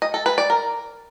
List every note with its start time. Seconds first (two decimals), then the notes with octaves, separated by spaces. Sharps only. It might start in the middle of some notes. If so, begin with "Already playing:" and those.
0.02 D#5
0.14 A4
0.26 B4
0.38 D5
0.50 A#4